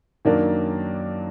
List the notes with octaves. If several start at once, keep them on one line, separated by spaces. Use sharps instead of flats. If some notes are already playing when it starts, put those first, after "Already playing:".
F#2 D#3 F#3 A#3 D4